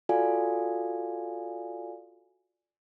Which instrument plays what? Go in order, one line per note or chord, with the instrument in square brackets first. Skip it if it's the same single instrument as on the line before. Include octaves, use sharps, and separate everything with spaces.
[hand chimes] F4 F#4 A4 D5 F5 G#5